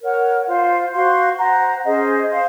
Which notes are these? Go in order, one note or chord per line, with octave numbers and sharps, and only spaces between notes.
A#4 C#5 F#5
F4 C5 F5 C6
F#4 C5 F5 C6
C5 F#5 A#5
C#4 G#4 C5 D#5
C5 F5 C6